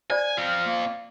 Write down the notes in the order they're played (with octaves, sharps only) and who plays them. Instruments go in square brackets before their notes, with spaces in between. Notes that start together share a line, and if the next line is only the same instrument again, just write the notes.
[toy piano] C5 D5 [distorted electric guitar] G#5
[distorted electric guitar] C4 F4 [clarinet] F6
[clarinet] A#3